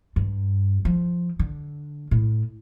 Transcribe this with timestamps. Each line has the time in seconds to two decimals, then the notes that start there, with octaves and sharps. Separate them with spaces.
0.16 G2
0.85 F3
1.39 D3
2.11 A2